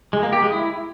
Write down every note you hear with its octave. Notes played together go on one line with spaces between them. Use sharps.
G#3
A#3
G4
G#3
E4